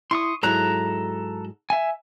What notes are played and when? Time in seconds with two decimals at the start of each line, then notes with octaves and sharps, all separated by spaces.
0.11 E4 C6 C#6 D#6
0.43 G#2 F#3 E4 A4 A#5 F#6
1.70 E5 G#5